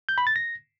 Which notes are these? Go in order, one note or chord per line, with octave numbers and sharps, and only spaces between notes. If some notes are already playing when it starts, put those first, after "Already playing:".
G6
B5
A6
A#6